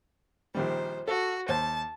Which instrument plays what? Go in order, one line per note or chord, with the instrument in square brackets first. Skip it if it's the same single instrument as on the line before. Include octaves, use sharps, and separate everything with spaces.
[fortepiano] A#1 D#3 G3 [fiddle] C5
[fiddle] F#4 [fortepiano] A4
[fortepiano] D#2 C5 [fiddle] A5